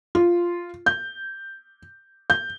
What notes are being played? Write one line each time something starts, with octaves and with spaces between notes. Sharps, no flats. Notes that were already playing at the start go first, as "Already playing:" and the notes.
F4
G6
G6